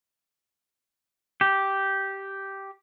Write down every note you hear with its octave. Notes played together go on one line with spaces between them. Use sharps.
G4